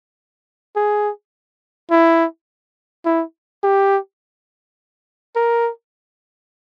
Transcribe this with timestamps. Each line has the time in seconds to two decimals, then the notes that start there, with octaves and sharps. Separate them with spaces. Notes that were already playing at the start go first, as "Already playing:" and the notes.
0.76 G#4
1.91 E4
3.06 E4
3.63 G4
5.35 A#4